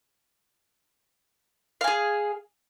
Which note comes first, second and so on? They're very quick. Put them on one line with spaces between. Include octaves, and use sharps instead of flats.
F5 G#5 G#4